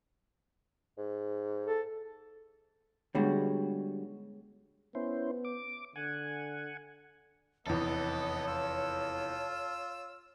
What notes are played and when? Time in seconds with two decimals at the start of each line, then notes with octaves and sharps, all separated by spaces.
0.98 G#2
1.66 A4
3.15 D3 G3 G#3 B3 F#4 C#5
4.95 B3 C#4 E4 C5
5.45 D6
5.96 D3 F#5 G#5
7.67 F1 E2 B3 A4 C#5 D#5
8.47 F4 E6